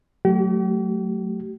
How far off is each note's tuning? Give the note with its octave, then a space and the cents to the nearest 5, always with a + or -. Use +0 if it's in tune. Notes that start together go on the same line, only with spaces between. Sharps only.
F#3 +10 A3 +0 G4 -45